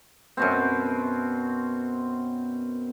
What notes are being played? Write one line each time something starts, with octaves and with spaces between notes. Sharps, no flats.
F#2 B2 C4